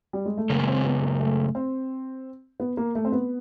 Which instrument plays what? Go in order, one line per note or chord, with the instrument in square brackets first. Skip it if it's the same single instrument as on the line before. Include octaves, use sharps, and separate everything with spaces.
[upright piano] G3
G#3
A3
[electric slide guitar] F#2 C#3 G#3 [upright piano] A#3
[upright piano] C4
B3
A#3
A3
C4
B3
A#3
A3
C4
B3